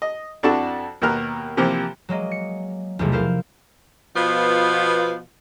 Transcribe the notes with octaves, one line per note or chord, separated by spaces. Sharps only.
D#5
F2 D4 E4 F#4 A4 A5
D#2 B2 A#3 B3 A#4 F6
C3 E3 F3 A#3 G4 A#4
F#3 G#3 A#3 D#5
C#7
B1 E2 C3 F3 A3
E4 A#4 C5 F5
B2 F3 B3 F4